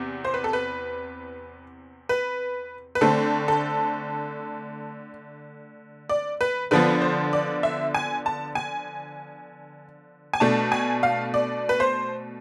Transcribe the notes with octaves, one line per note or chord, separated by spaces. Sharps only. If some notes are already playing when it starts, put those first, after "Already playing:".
Already playing: E2 C3
C5
B4
A4
B4
B4
B4
D3 A3 C4 A4
A4
D5
B4
D3 F3 B3 B4
C5
D5
E5
G#5
A5
G#5
G#5
B2 A3 D4 A5
G#5
F5
D5
B4
C5